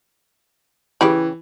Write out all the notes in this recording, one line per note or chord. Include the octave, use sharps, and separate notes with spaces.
C#3 E3 G4 B5